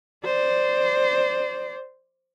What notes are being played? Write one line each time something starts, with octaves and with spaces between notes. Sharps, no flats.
C5 D5